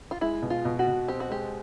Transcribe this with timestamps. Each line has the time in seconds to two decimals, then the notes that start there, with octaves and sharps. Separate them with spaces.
0.11 F4
0.21 G#3 E4
0.42 B2
0.50 F4
0.65 B2
0.79 F#4
0.87 B2
1.08 C4 G4
1.20 F#4
1.30 G#3 G4